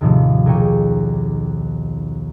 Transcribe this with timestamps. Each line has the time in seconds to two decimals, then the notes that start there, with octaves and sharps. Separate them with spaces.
0.01 D#2 A2 C3 D#3 F3
0.46 B1 G#4 A#4 G5 C#6 D#7